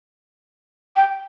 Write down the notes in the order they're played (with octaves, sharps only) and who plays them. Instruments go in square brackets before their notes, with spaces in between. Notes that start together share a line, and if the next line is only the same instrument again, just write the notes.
[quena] G5